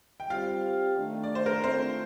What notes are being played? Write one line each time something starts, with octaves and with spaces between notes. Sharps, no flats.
G5
G3 C4 F4 G4 F5
D#3 A3 D4
D5
C5
A#4
D#3 A3 C4 D4 F4 A4 C5